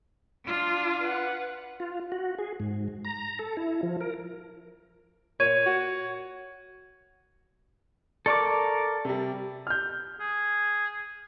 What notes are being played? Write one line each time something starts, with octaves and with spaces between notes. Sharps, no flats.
D4 F4
B4 F#5
F4
F#4
G#4
G#2
A#5
A4
E4
F3
A#4
A#2 C#5 G#6 D#7
F#4
A4 A#4 D5 C#6 D6
C3 G3
F6 G6
G#4